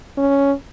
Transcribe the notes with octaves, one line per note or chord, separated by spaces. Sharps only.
C#4